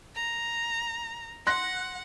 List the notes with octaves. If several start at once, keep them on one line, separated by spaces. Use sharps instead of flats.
A#5
F#5 C6 F#6 A#6